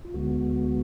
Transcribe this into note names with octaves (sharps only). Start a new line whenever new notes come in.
F4
D2 D3 G#3 B3 F#4